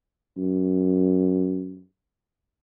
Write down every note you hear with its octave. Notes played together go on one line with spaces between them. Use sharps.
F#2